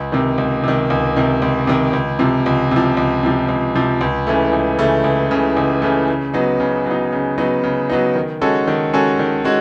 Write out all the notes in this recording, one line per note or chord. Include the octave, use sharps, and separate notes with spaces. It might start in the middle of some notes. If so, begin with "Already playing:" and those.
Already playing: C#2
C3 D#3
C#2
C3 D#3
C#2
C3 D#3
C#2
C3 D#3
C#2
C3 F3
C#2
C3 F3
C#2
C3 F3
C#2
C3 F3
C#2
C#3 E3 A3
C#2
C#3 E3 A3
C#2
C#3 E3 A3
C#2
C#3 E3 A3
C#3
F#3 B3 D#4
C#3
F#3 B3 D#4
C#3
F#3 B3 D#4
C#3
F#3 B3 D#4
D#3
G#3 C#4 F#4 A4
D#3
G#3 C#4 F#4 A4
D#3
G#3 C#4 F#4